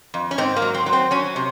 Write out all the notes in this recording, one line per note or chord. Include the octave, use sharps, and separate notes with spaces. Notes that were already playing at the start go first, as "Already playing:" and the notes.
F2
C#4
G#2 C4
A#3
F#3
C4
F#3
C4
F#3 C#4
C3